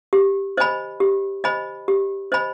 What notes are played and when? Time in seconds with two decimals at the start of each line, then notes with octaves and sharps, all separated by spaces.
0.13 G4
0.57 C5 D#5 G#5 B5
1.00 G4
1.44 C5 D#5 G#5 B5
1.88 G4
2.32 C5 D#5 G#5 B5